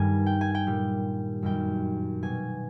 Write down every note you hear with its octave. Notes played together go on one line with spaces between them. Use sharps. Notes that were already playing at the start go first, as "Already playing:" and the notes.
Already playing: G2 D#3 G3 G#5
G5
G#5
G5
A#2 G3
F#2 D#3 G3 G5
B2 G3 G#5